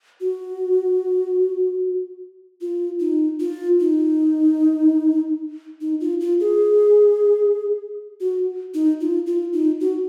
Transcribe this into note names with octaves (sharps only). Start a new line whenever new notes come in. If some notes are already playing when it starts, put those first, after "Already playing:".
F#4
F4
D#4
F4
D#4
D#4
F4
F4
G#4
F#4
D#4
F4
F4
D#4
F#4